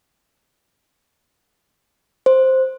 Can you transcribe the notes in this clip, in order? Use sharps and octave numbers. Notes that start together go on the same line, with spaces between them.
C5